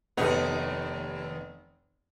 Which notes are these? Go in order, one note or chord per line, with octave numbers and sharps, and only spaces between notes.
F1 D#2 B3 D#4